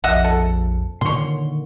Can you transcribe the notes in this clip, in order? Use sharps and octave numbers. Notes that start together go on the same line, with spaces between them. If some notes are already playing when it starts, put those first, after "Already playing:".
A#1 F2 D#5 E5 F#5
A4
A#2 D3 D#3 C#5 C6